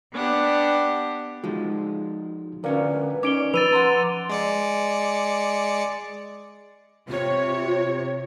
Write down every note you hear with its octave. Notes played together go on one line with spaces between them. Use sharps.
B3 D4 G4 F#5
F3 G#3 D#4 F4 F#4
D2 C#4 F4 A#4 B4 D5 F5
C#4 D#4 D5 D6 D7 G7
F3 B4 E6 A6 D#7 F7
F#5 A#5 C6
G#3 D5 C#7
C3 F4 C#5